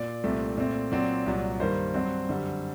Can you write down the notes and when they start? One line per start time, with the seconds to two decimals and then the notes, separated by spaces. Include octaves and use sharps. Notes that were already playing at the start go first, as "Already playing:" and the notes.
Already playing: A#2 D5
0.24 C2 A#2 A3 C4
0.58 A#2 A3 C4
0.92 A#2 F#3 C4 D5
1.26 C2 A#2 F#3
1.60 G2 D#3 G3 A#3 C5
1.94 G2 F#3 C4
2.29 F#2 D3 G3